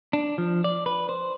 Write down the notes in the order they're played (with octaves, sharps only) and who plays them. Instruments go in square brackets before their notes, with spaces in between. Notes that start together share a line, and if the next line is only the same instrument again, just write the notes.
[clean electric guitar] D4
F3
D5
B4
C5